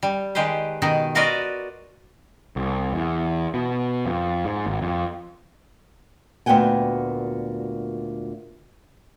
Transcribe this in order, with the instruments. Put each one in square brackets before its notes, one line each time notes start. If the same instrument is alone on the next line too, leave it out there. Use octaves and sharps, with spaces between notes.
[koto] G3
D#3 G#3 G4 B4 C5
B2 D#3 D#4
F4 F#4 A#4 B4 D5 D#5
[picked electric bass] C2
E2
B2
F2
G#2
G#1
F2
[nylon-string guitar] D2 A#2 B3 F#4 G5 G#5